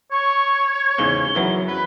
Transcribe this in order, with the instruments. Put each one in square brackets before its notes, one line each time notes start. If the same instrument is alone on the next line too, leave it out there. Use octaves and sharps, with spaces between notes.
[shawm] C#5 [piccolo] C#6
[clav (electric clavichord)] E2 G#2 C#3 [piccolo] G7
[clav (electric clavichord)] F#2 E3 F#3
[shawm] B4